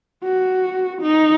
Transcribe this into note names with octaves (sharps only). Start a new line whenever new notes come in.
F#4
D#4